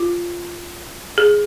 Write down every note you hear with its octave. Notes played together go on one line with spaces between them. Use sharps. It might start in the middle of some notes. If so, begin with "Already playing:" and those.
Already playing: F4
G#4